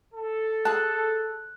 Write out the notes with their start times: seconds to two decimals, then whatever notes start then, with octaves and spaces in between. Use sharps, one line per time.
0.13 A4
0.65 G#4 A5 F#6